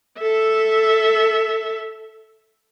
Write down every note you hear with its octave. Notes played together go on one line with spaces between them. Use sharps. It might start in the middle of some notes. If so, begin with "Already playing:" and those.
A4 E5